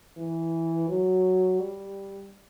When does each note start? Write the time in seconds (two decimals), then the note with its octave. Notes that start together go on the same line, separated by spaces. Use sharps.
0.17 E3
0.89 F#3
1.59 G3